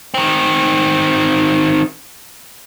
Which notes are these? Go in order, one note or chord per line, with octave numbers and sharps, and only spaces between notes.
D#3 C4